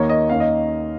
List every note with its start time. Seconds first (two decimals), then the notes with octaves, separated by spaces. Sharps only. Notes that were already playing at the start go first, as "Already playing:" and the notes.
Already playing: D#2 D#3 A#3 C#5
0.09 D#5
0.29 D#2 D#3 A#3 C#4 F5
0.40 D#5